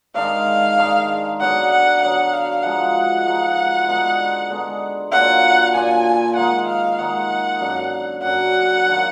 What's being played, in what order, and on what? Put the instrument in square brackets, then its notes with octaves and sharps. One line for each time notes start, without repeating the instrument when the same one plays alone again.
[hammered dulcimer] G#2 D#3 G#3 D4 [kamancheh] F5
[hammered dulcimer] G#2 D#3 G#3 D4
[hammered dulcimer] D3 F#3 B3 [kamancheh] F#5
[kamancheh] F#5
[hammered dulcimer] D3 F#3 B3 [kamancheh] F#5
[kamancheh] F5
[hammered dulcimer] F3 G#3 D#4 F#4 [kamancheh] F#5
[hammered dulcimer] F3 G#3 D#4 F#4
D3 G#3 B3 D#4
D3 G#3 B3 D#4
[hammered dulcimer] A#2 F#3 D4 F4 [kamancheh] F#5
[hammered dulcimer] A#2 F#3 D4 F4 [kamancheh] G#5
[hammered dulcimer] D#3 G#3 D#4 [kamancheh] F#5
[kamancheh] F5
[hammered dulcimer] D#3 G#3 D#4 [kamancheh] F#5
[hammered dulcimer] F#2 D3 F#3
[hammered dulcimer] F#2 D3 F#3 [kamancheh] F#5
[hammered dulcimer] D#3 F#3 D4 F4